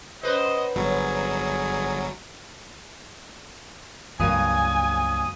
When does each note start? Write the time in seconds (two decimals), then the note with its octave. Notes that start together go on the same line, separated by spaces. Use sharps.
0.23 F#2 B4 C5 D#5
0.76 G1 F#3 G#4
4.20 C#2 G2 F#3 A#3 G#5 D#6